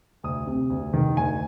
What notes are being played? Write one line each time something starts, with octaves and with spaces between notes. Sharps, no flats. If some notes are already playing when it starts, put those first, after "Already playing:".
D2 D#6
C3
D2
D#3
D2 G#5